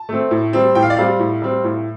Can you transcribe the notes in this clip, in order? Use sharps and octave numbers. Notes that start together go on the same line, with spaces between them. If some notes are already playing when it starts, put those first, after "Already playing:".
Already playing: A5
A3 C4
A2
G3 C4
A2 G5
F5
D5
G3 C4 F5
A2
G3 C4
A2